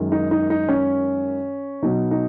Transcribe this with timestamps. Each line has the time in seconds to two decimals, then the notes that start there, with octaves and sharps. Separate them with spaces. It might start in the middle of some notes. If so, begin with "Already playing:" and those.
Already playing: F#2 D#3 G#3
0.12 D#4
0.31 D#4
0.50 D#4
0.69 C#4
1.82 B2 F#3 D#4
2.11 D#4